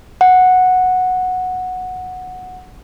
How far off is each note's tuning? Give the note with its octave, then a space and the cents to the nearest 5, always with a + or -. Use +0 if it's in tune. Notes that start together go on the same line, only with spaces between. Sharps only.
F#5 -5